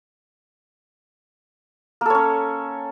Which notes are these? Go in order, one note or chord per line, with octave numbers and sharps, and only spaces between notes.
A#3 C#4 A4 C#5